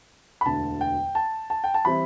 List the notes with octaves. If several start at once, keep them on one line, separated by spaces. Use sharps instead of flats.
B5
E1 D2 D3 A5
G5
A5
A5
G5
A5
E3 G3 C4 E4 B5